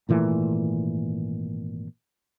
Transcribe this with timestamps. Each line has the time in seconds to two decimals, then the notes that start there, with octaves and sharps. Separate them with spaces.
0.09 G#1 A#2 E3 A3